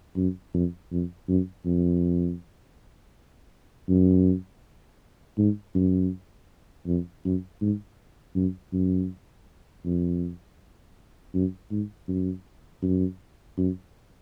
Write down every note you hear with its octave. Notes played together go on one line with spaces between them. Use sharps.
F#2
F2
F2
F#2
F2
F#2
G#2
F#2
F2
F#2
G#2
F#2
F#2
F2
F#2
G#2
F#2
F#2
F#2